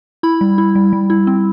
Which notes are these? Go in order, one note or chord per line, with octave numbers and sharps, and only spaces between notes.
E4 B5
G3
E4
G3
G3
E4
C4